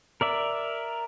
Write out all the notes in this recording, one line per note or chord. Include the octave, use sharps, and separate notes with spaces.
A#4 D5 E5